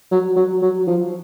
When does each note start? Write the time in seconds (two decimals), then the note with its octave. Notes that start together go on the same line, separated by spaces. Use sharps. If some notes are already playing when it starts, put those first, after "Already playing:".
0.11 F#3
0.36 F#3
0.62 F#3
0.87 F3